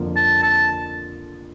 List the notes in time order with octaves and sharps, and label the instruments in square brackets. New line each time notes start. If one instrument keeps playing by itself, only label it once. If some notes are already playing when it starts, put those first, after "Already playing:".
Already playing: [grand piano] F2 D3 F3 A#3
[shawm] A5
A5